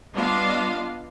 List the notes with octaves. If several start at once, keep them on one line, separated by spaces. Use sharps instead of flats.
G3 B3 D4 F4 D#5 F5